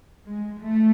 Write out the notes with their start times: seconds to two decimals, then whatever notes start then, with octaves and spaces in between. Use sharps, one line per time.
0.25 G#3
0.62 A3